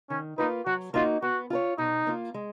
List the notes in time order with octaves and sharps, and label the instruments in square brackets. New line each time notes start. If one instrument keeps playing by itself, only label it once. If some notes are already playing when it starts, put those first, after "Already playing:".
[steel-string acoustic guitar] D#3 [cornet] C#4
[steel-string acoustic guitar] A#3 F4 B4 [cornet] D#4
[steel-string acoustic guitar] F#3 [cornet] F#4
[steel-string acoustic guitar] A#3 D#4 F#4 [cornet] F4
[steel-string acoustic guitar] B3 [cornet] F#4
[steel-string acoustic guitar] F4 A#4 C#5
[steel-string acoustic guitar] B2 [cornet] D#4
[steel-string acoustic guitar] A#3 F4
G#3